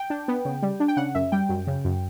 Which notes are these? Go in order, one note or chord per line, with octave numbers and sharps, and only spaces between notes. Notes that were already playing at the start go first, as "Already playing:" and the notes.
Already playing: G5
D4
B3
C#3
G3
D4
G5
C#3 F#5
F#2 E5
G3 G5
F#2
C#3
F#2